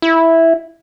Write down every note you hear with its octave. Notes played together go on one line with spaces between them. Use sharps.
E4